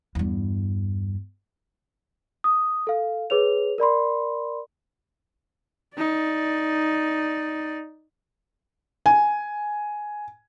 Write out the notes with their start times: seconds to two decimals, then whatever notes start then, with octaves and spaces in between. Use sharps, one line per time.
0.15 E2 G2
2.44 D#6
2.87 A4 F5
3.30 G#4 B4 C#5 F7
3.78 A#4 D5 B5 C6
5.97 D#4 D5
9.06 G#5